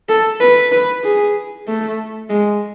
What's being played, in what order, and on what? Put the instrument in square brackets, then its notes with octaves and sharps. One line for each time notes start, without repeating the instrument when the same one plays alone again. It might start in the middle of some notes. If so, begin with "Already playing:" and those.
[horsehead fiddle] A4
B4
B4
G#4
A3
G#3